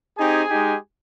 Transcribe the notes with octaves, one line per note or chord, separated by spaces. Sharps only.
C4 D#4 G4 G#4 G#5
G#3 D#4 G4